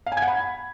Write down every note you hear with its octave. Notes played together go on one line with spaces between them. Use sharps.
F5
G#5
G#6
F#5
B5